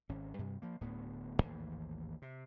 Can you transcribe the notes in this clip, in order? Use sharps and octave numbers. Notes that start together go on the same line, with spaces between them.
G#1 C#4
G2 C3 G3
F3 A#3
D1 D2 A2 B3
A1 D#2 G#2
C3